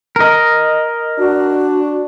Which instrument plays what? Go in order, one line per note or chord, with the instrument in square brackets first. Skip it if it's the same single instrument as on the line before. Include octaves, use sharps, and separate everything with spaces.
[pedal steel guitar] A#4 D#5
[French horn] D4 [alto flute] F#4